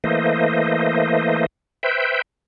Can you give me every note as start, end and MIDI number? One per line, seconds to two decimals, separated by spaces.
0.04 1.46 52
0.04 1.46 57
0.04 1.46 58
0.04 1.46 72
0.04 1.46 75
1.83 2.22 71
1.83 2.22 72
1.83 2.22 76
1.83 2.22 79